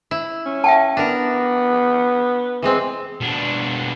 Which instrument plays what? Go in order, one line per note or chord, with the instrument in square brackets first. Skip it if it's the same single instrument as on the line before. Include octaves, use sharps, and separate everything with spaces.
[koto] E4
[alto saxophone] C#4
[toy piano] E5 G5 A5
[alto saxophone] B3 [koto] D4 A#4
[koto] E3 G#3 C4
[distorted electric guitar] B2 D4